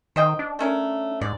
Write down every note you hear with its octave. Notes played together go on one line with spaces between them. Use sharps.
D#3 C5 D#5 G5
D4
A3 C#4 A#4
G#2 D5